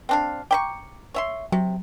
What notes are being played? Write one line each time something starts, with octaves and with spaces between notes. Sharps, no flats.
C4 D4 F5
G5 A#5 B5 C#6 D6
C#5 E5 C6
C3 F#3